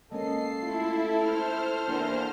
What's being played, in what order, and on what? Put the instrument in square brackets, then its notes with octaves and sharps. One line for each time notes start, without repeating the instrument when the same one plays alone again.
[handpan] G#3 A#3 C#4 [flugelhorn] A4 [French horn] D#5 [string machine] C7
[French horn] A3 [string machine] E4 [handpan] F4
[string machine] C5 F6
[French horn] E2 [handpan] A#3 D4